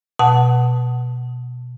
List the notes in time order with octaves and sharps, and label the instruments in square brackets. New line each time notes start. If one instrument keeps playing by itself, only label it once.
[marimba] B2 F#5 A5